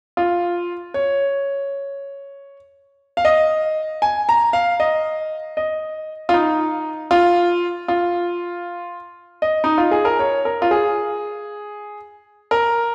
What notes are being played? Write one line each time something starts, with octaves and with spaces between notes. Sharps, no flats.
F4
C#5
F5
D#5
G#5
A#5
F5
D#5
D#5
F4
D#4
F4
F4
D#5
D#4
F4
G#4
A#4
C#5
A#4
F4
G#4
A#4